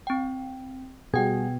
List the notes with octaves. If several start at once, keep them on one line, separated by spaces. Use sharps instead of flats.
C4 G5
B2 G3 F#4 G#4 G5 G#6